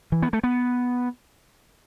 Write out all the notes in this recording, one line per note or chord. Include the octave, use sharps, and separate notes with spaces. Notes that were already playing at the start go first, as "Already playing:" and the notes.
E3
B3
A3
B3